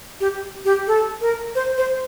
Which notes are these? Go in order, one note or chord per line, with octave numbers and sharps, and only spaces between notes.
G4
G4
A4
A#4
C5
C5